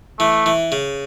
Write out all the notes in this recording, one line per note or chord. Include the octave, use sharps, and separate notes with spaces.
E3 A3
E3
C#3